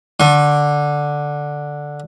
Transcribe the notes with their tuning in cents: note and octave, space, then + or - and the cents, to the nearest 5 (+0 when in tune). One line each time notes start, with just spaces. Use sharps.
D3 +0 C#6 -40